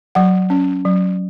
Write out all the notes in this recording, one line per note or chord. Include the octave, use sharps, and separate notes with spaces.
F#3 F#5
C#4
F#3